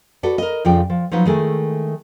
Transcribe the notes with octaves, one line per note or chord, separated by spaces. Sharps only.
F#4 A4 B4 D5
A#4 D#5
F2 C#3 F3 F4 D5 G5
F3
F3 F#3 D#4 B4
D#3 G#3 A3 E4 G#5